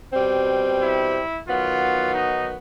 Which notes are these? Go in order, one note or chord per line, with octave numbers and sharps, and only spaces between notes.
B2 G3 C4
E4
D#3 F#3 B3 F4
D#4